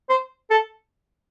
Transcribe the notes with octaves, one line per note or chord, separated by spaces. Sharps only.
C5
A4